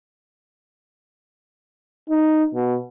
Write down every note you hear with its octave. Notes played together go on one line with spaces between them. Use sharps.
D#4
B2